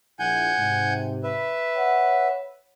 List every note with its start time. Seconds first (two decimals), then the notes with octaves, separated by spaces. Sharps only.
0.19 A#1 E4 F#5 G#5 G6
0.58 G#2 C3
1.23 B4 E5
1.76 C#5 F#5